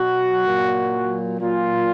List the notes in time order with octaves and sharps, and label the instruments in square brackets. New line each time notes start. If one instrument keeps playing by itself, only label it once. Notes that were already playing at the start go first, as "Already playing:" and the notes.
Already playing: [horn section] B2 F#3 F#4
A#2 F#3
A#2 F#3 F4